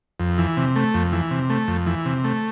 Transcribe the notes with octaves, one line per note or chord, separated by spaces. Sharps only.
F2
E3
C3
A3
F2
E3
C3
A3
F2
E3
C3
A3